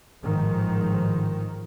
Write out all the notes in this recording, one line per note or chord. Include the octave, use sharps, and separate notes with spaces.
A1 G#2 D#3 F3